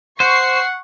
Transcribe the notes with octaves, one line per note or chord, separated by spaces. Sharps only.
C5 F#5 C#6 C7